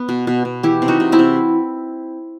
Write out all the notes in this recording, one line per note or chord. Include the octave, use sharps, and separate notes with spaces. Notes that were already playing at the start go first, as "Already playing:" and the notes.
Already playing: B3
B2
B2
B2
E3 E4 G4
C3
D#4 F#4
C3
C4 E4
C3